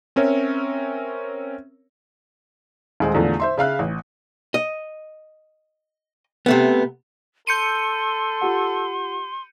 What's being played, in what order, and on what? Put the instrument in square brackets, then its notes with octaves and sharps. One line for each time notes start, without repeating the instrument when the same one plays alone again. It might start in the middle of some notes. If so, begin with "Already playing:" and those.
[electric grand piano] C4 C#4 A#4 C#5 E5
[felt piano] D#1 G#3 C5
E2 A2 D3 F3
C5 E5 C6
C#3 E5 F5 F#6
A1
[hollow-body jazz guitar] D#5
C3 A3 B3
[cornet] A4 [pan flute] C6 [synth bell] G6 C#7 D#7
[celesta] F4 G4 F#5